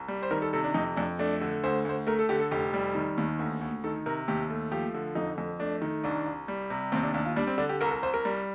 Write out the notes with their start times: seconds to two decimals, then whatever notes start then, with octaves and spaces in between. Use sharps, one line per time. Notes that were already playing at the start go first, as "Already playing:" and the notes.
Already playing: C2
0.08 G3
0.23 C5
0.31 D#3 A#4
0.42 A4
0.53 C3 A4
0.64 D4
0.74 F2 D#4
0.96 F2 D4
1.19 A3 D4
1.41 D3
1.64 D2 C5
1.85 D2 C5
2.07 A3 A#4
2.19 A4
2.29 D3 G4
2.40 A4
2.51 F1 G4
2.74 G3
2.95 D#3
3.18 D#2
3.39 D2
3.61 D2
3.84 D#3 A4
4.06 C3 A#4
4.28 D#2 G4
4.50 A3
4.72 F3 G4
4.94 D3
5.15 F2 D#4
5.38 F2
5.59 A3 D4
5.82 D#3
6.04 C2 D4
6.26 C2
6.48 G3
6.70 C3
6.92 D#2 C4
7.03 D4
7.14 D#2 D4
7.25 F4
7.36 G3 D4
7.47 C4
7.58 D3 D4
7.69 G4
7.81 C2 A#4
7.86 A4
7.91 A#4
8.03 C2 C5
8.14 A#4
8.25 G3